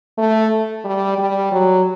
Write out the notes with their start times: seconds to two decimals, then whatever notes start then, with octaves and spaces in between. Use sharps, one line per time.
0.18 A3
0.84 G3
1.18 G3
1.52 F#3